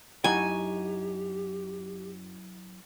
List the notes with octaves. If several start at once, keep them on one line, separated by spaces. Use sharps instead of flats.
F#2 F#3 D#4 E4 F#4 G4 G5 G#5